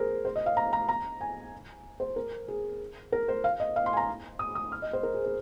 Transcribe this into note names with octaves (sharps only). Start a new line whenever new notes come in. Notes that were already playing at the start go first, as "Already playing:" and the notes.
Already playing: G#4 A#4 C5
C5
D#5
F5
A#5
A#5
A#5
G#5
C5
A#4
G#4
A#4
C5
F5
D#5
F5
C6
G#5
A#5
D#6
D#6
F6
D#5
C5
A#4
G#4
A#4